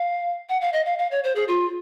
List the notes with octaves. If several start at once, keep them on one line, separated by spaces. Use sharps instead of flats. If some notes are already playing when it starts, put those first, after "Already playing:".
Already playing: F5
F#5
F5
D#5
F5
F5
C#5
C5
G#4
F4